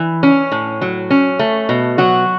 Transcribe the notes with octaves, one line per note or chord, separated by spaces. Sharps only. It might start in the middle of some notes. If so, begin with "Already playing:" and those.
Already playing: E3
C#4
A2
F#3
C#4
A3
B2
F#3 F#4